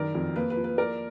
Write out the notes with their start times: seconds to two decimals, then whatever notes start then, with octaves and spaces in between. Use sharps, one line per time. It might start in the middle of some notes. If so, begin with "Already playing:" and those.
Already playing: F#2 D#3 A#4 D5
0.15 F2
0.36 A#3 B4
0.50 B4
0.57 F3
0.64 B4
0.78 A#3 A#4 D5